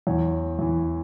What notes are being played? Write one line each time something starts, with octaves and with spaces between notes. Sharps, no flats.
E2 E3 C#5
E2 E3